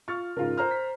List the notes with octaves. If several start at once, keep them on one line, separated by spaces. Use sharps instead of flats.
F4 C#6 F6 A6
G#2 C#3 F4 A#4
C5 A#5 F6
B6